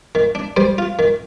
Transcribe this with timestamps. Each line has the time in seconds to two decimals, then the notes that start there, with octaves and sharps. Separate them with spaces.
0.15 D#3
0.35 D4
0.57 G3 C5
0.78 F4
0.99 D#3